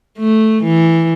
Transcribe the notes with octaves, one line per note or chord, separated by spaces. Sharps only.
A3
E3